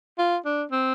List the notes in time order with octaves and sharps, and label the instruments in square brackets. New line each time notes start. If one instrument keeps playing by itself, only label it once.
[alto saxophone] F4
D4
C4